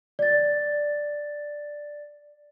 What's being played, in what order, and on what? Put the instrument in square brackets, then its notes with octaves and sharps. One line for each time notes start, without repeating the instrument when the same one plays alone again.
[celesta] D5 A6